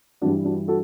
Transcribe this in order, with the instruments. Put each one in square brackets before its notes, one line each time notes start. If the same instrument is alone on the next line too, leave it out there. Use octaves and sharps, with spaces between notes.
[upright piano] G2 E3 G3 D4 F#4
D4 F#4
F#4 A4